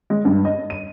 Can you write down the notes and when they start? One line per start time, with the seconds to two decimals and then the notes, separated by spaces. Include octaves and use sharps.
0.10 G#3
0.25 G2
0.45 D#5
0.70 D#7